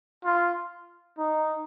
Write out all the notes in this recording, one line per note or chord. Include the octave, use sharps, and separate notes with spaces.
F4
D#4